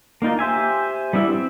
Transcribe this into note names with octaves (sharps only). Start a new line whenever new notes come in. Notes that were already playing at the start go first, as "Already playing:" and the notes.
A#3 D4 D#4 F4
G4 C5 E5 G#5
G3 B3 D4 E4
C4